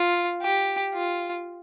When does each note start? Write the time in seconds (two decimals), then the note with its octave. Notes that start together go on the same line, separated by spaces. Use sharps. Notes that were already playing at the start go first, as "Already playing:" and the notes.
Already playing: F4
0.42 G4
0.94 F4